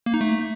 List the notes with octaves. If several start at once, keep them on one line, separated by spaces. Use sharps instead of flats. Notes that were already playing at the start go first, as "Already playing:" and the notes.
A#3
D#4
A3